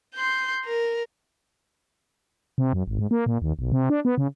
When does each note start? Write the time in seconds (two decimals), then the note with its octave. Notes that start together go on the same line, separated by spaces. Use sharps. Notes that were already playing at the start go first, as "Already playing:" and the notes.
0.15 C6 G6
0.65 A#4
2.58 C3
2.73 F#2
2.87 G#1
2.99 G#2
3.11 A#3
3.26 A#2
3.42 D#2
3.59 B1
3.72 C3
3.90 D4
4.05 B3
4.18 C#3